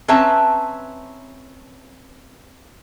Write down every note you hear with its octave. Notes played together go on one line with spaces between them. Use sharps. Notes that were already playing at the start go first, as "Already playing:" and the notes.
C4 C#4 B4 E5 A5 A#5